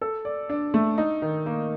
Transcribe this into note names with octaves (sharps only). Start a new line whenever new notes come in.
A4
D5
D4
A3
D#4
D#3
A#3